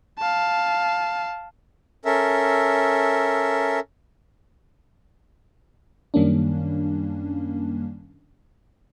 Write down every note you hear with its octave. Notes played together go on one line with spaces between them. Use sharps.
F5 A5
C#4 A4 A#4 E5
F#2 D#3 G3 A#3 C#4 D4